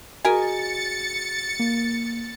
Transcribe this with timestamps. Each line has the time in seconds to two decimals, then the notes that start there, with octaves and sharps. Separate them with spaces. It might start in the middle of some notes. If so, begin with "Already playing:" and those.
0.25 F#4 G#4 A#4 D#5 G#5 A6 C#7
1.59 A#3